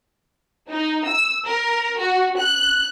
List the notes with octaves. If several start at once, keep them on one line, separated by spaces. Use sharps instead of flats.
D#4
E6
A#4
F#4
F#6